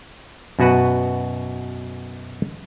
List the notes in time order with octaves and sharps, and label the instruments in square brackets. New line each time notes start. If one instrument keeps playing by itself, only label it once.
[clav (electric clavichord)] F#2 B2 F#4 B4 F#5